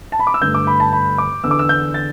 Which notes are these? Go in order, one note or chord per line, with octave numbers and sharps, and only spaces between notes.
A5
B5
D6
E6
G2 D3 A3 G6
D6
B5
A5
B5
D6
E2 D3 B3 E6
D6
E6
G6
A6